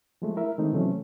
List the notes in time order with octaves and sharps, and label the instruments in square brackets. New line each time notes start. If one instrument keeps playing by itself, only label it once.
[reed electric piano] F3 G#3 A3
E4 A#4 E5
D#3 G#3 A3 C4 D#4
C3 E3 F#3 A3 C4 C#4